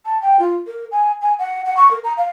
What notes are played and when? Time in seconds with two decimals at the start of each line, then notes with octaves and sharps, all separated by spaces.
0.05 A5
0.22 G5
0.39 F4
0.67 A#4
0.91 G#5
1.22 G#5
1.39 F#5
1.65 F#5
1.77 C#6
1.91 A#4
2.04 A#5
2.17 F5